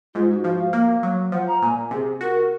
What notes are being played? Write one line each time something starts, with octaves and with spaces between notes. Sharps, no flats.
G#2 F4
F#4
F3 F#4
F5
A#3
F#3
F3 F#5
A#5
A#2 G#5
C3 G#4
F#4 A#4